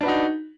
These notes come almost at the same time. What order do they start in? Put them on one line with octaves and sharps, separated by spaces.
D4 B4 F#4 D#4